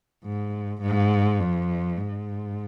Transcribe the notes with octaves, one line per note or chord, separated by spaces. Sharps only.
G#2
G#2
F2
G#2